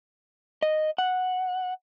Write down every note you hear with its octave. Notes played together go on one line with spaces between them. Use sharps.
D#5
F#5